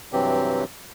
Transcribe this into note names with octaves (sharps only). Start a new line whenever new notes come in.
G2 C3 E3 F#3 C4 G4